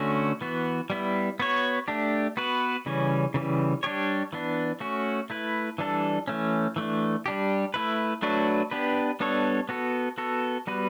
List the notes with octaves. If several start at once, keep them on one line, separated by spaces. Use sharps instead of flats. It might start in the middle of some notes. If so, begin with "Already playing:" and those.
Already playing: D3 A3 C#4 F#4
E3 B3 F#4
G3 B3 E4
B3 F#4 C#5
A3 D4 G4
B3 F#4 B4
C#3 E3 G3 C#4
C#3 E3 G3
G3 D4 G4 C#5
E3 B3 D4
A3 C#4 F#4
A3 E4 B4
E3 G3 D4 A4
E3 A3 C#4
E3 A3 D4
G3 D4 G4
A3 E4 B4
F#3 A3 D4 F#4 B4
B3 D4 G4 B4
G3 B3 D4 A4 C#5
B3 F#4 A4
B3 F#4 A4
G3 B3 F#4 B4